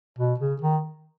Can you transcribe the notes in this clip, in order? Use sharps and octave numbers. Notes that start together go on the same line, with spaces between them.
B2
C#3
D#3